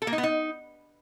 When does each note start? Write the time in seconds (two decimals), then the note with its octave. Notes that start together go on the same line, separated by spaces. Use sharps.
0.02 A4
0.07 A#3
0.13 D#4
0.18 B3
0.23 D#4